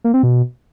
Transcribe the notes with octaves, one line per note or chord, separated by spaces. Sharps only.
A#3
C4
B2